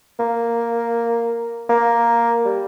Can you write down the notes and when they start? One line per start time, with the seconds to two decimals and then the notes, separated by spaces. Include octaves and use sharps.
0.19 A#3
1.70 A#3
2.45 G3